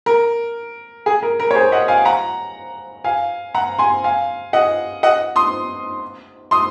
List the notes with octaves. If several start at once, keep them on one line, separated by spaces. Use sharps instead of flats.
A#4
G#4
A#4
A#4
C#5
G#4 C5
D#5 F#5
F5 G#5
F#5 A#5
F5 G#5
F#5 A#5
G#5 C6
F5 G#5
D#5 F#5
D#5 F#5
C6 D#6
C6 D#6